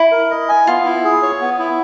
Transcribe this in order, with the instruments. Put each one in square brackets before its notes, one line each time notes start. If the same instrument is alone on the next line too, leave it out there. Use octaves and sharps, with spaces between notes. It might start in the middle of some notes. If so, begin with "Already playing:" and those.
Already playing: [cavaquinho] E4
[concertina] A#4
D#5
G#5
[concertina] B3 [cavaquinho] F4
[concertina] E4
G#4
C#5
B3
E4